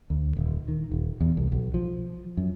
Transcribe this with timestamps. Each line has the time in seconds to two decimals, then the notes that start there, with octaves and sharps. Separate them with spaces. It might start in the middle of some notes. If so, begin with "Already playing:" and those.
0.10 D2
0.37 D#1
0.68 D#3
0.91 D#1
1.21 E2
1.37 C2
1.52 B1
1.74 F3
2.37 F#2